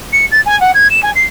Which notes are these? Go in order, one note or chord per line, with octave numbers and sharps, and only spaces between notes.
C#7
A6
G#5
F#5
G#6
E7
G#5
C7